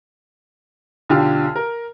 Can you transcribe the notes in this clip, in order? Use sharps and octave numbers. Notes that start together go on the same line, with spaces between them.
B1 D3 F4 G4 F6
A#4